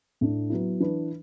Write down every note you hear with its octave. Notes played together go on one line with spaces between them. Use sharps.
A2 A3 D4
F#3 B3 E4
E3 D4 B4